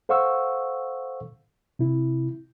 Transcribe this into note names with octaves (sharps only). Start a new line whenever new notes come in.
A4 C5 F5 F#5 C#6 E6
C3 E4